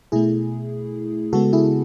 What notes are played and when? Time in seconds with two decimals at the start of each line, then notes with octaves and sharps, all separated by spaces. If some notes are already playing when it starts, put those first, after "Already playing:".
0.12 B2 A3 E4 G#4
1.33 C#3 G#3 B3 F#4 A4
1.53 E4 G#4